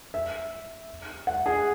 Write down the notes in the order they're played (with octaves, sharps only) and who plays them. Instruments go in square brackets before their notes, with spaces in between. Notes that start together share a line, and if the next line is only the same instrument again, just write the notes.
[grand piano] E5
F#5
G#4